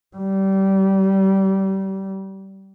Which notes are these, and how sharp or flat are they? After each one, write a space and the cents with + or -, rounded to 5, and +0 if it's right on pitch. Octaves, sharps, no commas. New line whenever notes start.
G3 -25